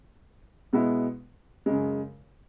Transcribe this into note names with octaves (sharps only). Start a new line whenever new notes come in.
B2 G#3 B3 E4
F#2 C#3 G#3